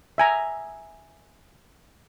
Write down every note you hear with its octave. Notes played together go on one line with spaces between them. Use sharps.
E5 G#5 A#5